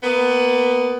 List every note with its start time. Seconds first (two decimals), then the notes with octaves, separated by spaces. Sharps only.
0.04 A#3 B3